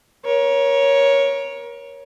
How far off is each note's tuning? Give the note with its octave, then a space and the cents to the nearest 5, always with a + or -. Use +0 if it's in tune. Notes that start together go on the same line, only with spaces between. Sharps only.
A#4 +30 C#5 +0